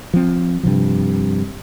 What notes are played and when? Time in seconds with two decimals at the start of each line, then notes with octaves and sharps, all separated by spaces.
0.14 F3 C4
0.63 G2 C3 F3